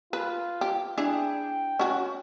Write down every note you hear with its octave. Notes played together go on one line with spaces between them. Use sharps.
F4 B4
G4
D4 E4 G#4 G5
C#4 F#4